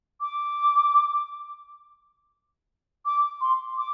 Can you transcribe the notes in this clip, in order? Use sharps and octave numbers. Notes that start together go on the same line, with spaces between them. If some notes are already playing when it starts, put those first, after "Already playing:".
D6
D6
C6
D6